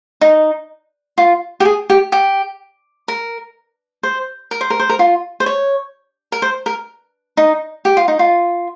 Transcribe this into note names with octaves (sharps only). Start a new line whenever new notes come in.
D#4
F4
G4
G#4
G4
G4
A#4
C5
A#4
C5
A#4
C5
A#4
F4
C5
C#5
A#4
C5
A#4
D#4
G4
F4
D#4
F4